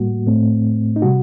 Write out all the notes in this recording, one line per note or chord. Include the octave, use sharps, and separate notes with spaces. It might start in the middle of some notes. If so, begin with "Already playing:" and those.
Already playing: A2 G3 A#3 F#4
A2 A3 C4
D#4
C3 G3 F#4